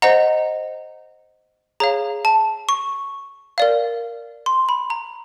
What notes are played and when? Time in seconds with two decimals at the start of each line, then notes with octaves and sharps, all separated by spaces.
0.02 C5 D#5 F#5 A#5
1.80 G#4 C#5 F5 A#5
2.25 A5
2.69 C#6
3.58 A#4 D5 F5
4.46 C6
4.69 B5
4.90 A#5